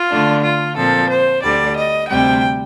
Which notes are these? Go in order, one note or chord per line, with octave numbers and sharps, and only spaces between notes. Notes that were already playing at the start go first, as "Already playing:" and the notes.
Already playing: F4
D3 A3 D4
F4
A#2 F3 C4 A4
C5
D2 D3 G3 D5
D#5
D2 C3 G3 C4 G5